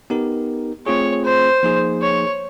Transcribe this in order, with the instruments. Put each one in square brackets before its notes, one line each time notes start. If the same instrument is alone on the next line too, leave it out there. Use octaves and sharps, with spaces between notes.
[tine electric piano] B3 D#4 G4 A#4
[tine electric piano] A3 C4 F4 G#4 [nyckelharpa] C#5
[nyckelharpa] C5
[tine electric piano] F3 A#3 D#4 G#4
[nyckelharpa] C#5